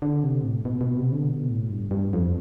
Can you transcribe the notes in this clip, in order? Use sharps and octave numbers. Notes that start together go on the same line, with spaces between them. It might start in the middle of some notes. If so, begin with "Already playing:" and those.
D3
C3
A2
B2
B2
C3
D3
B2
A2
G2
G2
F2